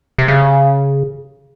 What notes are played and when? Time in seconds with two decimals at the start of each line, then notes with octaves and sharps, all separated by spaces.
0.18 C3
0.28 C#3